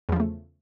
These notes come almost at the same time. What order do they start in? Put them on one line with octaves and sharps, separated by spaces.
E2 F3 C#3 A3